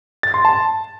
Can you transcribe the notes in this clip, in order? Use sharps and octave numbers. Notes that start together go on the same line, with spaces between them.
A6
C6
A5